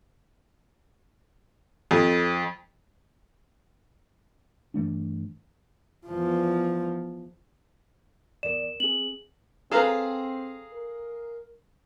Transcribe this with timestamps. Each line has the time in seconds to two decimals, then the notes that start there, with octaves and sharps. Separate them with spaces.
1.91 F2
4.74 G2 E3 A3 D4
6.07 E2 F3
8.43 A1 E2 A#4 D5 E7
8.80 C4 G#4 F#7
9.71 C4 G#4 A4 B4 F5 A#5
10.73 A#4